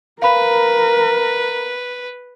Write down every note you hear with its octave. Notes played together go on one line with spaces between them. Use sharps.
A#4 B4 F5 B5